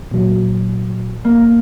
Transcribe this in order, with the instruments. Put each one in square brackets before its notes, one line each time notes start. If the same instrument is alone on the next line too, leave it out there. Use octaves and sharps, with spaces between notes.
[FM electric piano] A#2 F#3
[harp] A#3